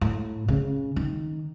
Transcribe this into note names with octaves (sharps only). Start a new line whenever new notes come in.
A2
C#3
D#3